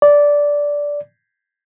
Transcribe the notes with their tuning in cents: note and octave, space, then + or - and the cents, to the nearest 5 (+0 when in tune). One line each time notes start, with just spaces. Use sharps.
D5 -10